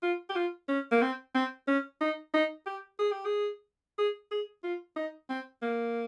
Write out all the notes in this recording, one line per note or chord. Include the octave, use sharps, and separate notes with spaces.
F4
G4
F4
C#4
A#3
C4
C4
C#4
D#4
D#4
G4
G#4
G4
G#4
G#4
G#4
F4
D#4
C4
A#3